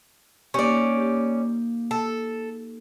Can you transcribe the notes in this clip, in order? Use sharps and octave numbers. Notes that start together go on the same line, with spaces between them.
A#3 C#4 D#4 G4 D5
G4
A4